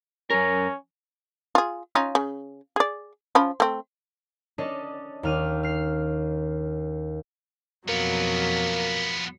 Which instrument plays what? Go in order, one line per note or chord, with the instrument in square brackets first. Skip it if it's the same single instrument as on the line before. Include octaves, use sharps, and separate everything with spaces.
[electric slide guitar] F#2 A#4 [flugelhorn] C#4
[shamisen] F4 G#4
C#4 D#4 F4
C#3
G#4 D5
F3 C#4 B5
A3 C4
[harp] C#4 D4 A4 D#5
D#2 F6 D#7
F6 C7
[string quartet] F2 B2 F#3 [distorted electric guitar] F3 B3 [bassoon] A#3